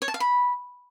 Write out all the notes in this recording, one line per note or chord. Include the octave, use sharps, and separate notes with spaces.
C#5
A5
F5
B5